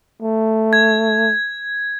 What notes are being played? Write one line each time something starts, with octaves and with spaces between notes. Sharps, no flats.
A3
G#6